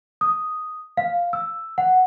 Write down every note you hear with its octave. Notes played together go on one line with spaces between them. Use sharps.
D#6
F5
E6
F#5